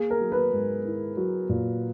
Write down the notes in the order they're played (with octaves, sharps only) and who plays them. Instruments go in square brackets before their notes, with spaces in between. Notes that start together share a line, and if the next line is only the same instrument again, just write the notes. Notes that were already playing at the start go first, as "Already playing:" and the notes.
Already playing: [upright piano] A#3 [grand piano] G#4
[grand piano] A#4
[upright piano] F#3
[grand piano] B4
[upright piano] G#2
E4
F#3
A#2